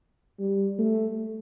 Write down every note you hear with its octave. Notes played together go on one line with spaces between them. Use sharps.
G3
A3